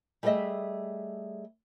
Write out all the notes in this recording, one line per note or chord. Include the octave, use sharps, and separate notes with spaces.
G3 A3 G#4 A4 D#5 E5